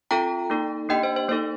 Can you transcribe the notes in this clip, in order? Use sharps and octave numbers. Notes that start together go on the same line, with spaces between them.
C4 F4 A4 G5 A#5
A#3 D#4 A4
A#3 D4 G4 D#5 G5
C5
C5
A#3 D#4 A4 C5